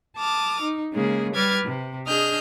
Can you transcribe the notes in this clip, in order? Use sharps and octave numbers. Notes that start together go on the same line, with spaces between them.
A5 D6 D#6 F6
D#4
C#3 G#3 A#3 G#4
G3 B4 D6 F6 G#6 A6
C3
D4 G#4 D#5 D#6 F6 G6